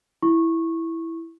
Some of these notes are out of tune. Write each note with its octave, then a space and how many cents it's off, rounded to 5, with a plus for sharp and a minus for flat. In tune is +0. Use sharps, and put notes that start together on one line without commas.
E4 +0 C#6 -15